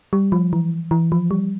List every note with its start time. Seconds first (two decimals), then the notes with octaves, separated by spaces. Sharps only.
0.13 G3
0.32 F3
0.53 E3
0.91 E3
1.12 F3
1.31 G3